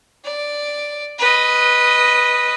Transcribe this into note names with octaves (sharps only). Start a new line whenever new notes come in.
D5
B4 D#5